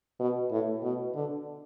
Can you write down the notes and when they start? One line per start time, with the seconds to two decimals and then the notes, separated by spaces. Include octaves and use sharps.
0.20 B2
0.51 A2
0.83 B2
1.15 D3